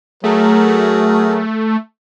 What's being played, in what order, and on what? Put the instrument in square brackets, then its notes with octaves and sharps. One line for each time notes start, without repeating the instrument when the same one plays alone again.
[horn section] F#3 G#4 A#4 [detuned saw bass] A3